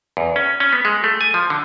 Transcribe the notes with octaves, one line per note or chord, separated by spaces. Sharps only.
E2
C#4
C#4
B3
G#3
A3
G#5
F3
D3